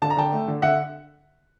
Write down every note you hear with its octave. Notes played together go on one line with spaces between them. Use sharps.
D3 A5
A#5
D3 G5 A5
A3
D3
D3 E5 F#5